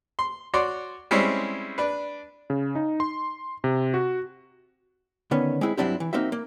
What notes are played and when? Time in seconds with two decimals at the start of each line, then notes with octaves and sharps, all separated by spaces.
0.19 C6
0.54 F#4 C#5 D5 C6
1.11 G3 G#3 C4 C#4 E4
1.78 D4 B4
2.50 C#3
2.75 D#4
3.00 C6
3.64 C3
3.94 F#4
5.31 D3 D#3 B3 C#4
5.61 G#3 C4 E4 G#4
5.77 G2 F#3 C4 D4 E4 G4
6.00 E3
6.13 A#3 C4 D#4 F#4 E5
6.32 A#3